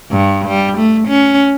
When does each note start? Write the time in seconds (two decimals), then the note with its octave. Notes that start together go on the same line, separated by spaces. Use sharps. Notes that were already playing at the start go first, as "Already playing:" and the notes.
0.12 G2
0.48 G3
0.78 A3
1.08 C#4